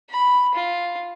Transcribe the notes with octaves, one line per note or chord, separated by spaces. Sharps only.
B5
F4